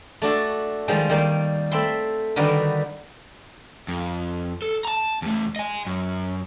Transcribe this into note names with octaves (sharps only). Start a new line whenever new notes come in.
A3 D4 F#4 A4
D#3 F3 G3 G#3
D#3 G3 A#3
A3 C4 E5 B5 C6
D3 D#3 G3 F#4 A#4 B4
F2
A4
A5 A#5
E2 A3
D#5 G#5
F#2